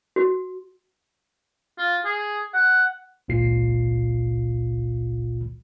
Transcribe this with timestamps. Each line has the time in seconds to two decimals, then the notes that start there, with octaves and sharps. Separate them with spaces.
0.16 F#4
1.78 F4
2.05 G#4
2.54 F#5
3.28 G#1 C#2 A#2 F4 C7